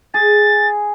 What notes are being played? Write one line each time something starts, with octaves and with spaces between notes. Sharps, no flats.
G#4 A6